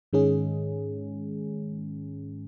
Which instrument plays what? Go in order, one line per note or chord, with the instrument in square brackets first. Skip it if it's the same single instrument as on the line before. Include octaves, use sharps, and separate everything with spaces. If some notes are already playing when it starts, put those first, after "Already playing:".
[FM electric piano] G#2 D#3 G#3 C#4 G#4